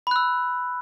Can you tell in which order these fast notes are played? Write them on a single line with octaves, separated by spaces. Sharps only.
B5 F#6 E6